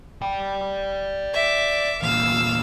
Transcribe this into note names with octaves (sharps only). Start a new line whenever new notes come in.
D5 G5
E5 D6
E2 A#2 F5 E6